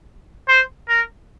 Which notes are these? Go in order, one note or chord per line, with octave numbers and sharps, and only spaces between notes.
C5
A#4